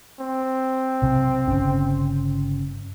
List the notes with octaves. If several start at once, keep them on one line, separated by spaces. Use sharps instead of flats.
C4
B1 C3
G1 C#3 C#4